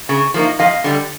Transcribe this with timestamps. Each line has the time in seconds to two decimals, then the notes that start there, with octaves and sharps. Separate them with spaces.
0.09 C#3
0.34 F3 A#3 D#4
0.59 F2 D#5 F5
0.84 D3 G3